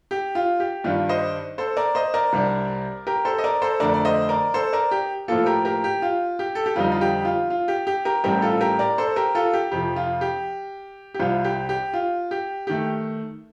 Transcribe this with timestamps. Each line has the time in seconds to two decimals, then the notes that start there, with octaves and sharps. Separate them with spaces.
0.11 G4
0.35 F4
0.60 G4
0.84 G2 D#3 G3 D4 F4
1.09 C5 D#5
1.58 A4 C5
1.77 A#4 D5
1.95 C5 D#5
2.14 A#4 D5
2.33 C2 C3 G3 D4
3.07 G4 A#4
3.25 A4 C5
3.38 D#5
3.44 A#4 D5
3.62 A4 C5
3.80 F2 D3 A3 D4 A#4 D5
3.94 D5
4.05 C5 D#5
4.29 A#4 D5
4.54 A4 C5
4.73 A#4 D5
4.91 G4
5.28 A2 F3 A#3 F4 A4
5.46 G4 A#4
5.65 G4 A#4
5.84 G4
6.02 F4
6.39 G4
6.55 A4
6.66 G4
6.76 F2 D3 G3 C4 D#4 F4
6.92 F4
7.01 G4
7.25 F4
7.50 F4
7.68 G4
7.87 G4
8.05 G4 A#4
8.24 A1 A2 G3 C4 G4 A#4
8.42 F4 A4
8.61 G4 A#4
8.79 A#4 D5
8.98 A4 C5
9.16 G4 A#4
9.35 F4 A4
9.54 G4
9.71 F2 C3 F3 G4
9.96 F4
10.21 G4
11.14 G4
11.20 C2 C3 G3 F4
11.44 G4
11.69 G4
11.93 F4
12.31 G4
12.67 D#3 A3 G4